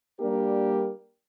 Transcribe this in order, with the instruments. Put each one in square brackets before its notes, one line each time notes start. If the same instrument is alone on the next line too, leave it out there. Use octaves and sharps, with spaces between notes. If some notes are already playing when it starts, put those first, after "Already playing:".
[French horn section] G3 A#3 D4 G4 A#4